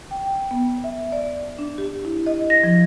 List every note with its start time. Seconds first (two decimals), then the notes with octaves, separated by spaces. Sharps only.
0.11 G5
0.51 B3
0.84 E5
1.12 D5
1.59 D4
1.78 G4
2.05 E4
2.26 D#5
2.50 A#6
2.63 F3